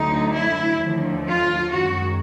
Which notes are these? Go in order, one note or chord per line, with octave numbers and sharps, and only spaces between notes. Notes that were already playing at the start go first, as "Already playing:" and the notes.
Already playing: D2 D3 F#3 A3 D#4
E4
D#2 D3 F3 A3
F4
F#2 D#3 G#3 F#4